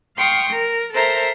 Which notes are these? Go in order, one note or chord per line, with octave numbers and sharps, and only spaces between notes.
F5 G5 C6 C#6 D#6
A#4
A4 A#4 C5 E5 A#5